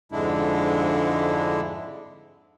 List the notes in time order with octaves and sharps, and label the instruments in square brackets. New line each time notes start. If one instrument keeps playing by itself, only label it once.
[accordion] F2 G#2 D3 G#3 D4 E4